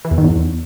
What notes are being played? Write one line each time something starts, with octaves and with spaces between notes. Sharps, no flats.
E3
E2
D#3
E2